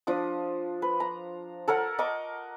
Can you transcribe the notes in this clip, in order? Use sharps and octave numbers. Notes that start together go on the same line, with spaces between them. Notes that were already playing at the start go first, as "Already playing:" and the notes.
F3 D4 D#6
B4
A#5
A4 A#4 C#5 F#5
A#4 D#5 C#6 D6